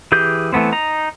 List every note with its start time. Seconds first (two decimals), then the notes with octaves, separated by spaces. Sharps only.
0.12 E3 G4 G#4 G6
0.52 E3 A3 B3 C4
0.72 D#4 A#5